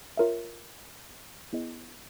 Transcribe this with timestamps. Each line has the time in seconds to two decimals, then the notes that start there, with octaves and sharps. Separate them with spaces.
0.17 F4 A#4 C#5 E5
1.53 B3 E4 G#4 C5 D#5